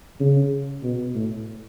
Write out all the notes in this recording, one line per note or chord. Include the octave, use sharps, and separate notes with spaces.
C#3
B2
A2